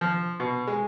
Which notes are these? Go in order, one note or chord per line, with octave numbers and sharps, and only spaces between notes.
F3
B2
G#3